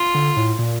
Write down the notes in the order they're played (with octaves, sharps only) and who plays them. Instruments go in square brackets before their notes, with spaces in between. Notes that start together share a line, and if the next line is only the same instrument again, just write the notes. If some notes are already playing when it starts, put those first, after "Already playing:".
Already playing: [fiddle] F4
[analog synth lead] D3
A2
A#2